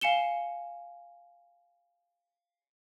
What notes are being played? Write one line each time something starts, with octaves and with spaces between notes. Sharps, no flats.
F5 G#5 C#7 E7 G7